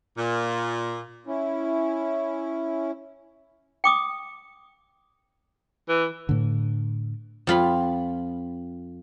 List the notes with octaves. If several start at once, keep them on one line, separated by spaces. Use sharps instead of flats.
A#2
C#4 E4
G5 D6 D#6
E3
A2 D3
F2 F4 B5